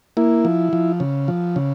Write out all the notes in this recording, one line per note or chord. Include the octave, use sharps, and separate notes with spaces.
A#3 E4
F3
F3
C#3
F3
C#3